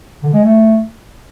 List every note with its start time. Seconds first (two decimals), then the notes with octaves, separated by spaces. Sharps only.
0.23 D3
0.34 G#3
0.45 A3